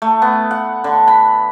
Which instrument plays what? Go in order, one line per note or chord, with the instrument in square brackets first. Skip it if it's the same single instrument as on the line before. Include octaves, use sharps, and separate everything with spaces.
[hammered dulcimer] A3
B3
F#5
D3
B5